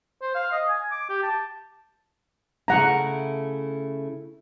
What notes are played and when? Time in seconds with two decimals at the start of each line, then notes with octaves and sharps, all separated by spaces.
0.22 C5
0.35 F5
0.51 D#5
0.69 G#5
0.91 D6
1.09 G4
1.23 A5
2.68 C#3 A3 E4 F#5 A#5